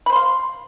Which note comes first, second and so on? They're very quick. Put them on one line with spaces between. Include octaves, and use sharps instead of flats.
B5 C5 C6 F5